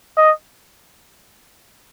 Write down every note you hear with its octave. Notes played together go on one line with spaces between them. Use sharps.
D#5